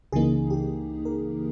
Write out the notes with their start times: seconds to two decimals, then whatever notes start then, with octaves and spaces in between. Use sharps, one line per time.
0.12 C#2 C#3 E3 A#3 D#4 G#4
0.50 G4
1.05 A#4